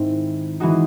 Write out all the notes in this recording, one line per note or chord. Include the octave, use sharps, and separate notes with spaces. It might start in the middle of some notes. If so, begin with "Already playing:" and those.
Already playing: G#2 D#3 G#3 C4 E4
E3 G#3 D#4 F#4